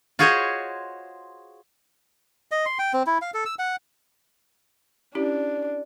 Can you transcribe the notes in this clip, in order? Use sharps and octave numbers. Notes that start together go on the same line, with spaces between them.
F4 F#4 G#4 C5 C#5 D#5
D#5
C6
G5
C4
E4
F5
A4
E6
F#5
C#4 D4 E4 G4